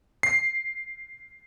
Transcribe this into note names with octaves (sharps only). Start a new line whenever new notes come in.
C7